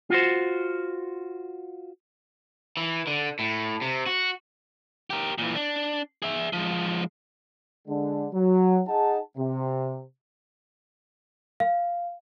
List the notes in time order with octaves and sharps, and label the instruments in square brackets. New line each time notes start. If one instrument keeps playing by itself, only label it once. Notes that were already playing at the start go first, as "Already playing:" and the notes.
[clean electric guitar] F4 F#4 C5
[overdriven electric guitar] E3
D3
A2
C3
F#4
[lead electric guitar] G4 A#4
A#2 E3
D4
G#4 E5
F3 G#3
[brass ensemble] D3 G#3 D4
F#3
D#4 G#4 F#5 A5
C3
[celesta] F5